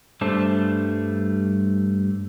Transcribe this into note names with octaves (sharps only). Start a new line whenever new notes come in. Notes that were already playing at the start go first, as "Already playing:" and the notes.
G2 G3 A3 D4 C5 A5